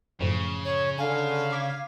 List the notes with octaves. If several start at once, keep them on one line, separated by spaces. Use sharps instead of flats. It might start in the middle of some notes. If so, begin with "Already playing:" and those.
F#2 A2 C#3 F3
C#5
D3 F5 G#5
D6 G#6 B6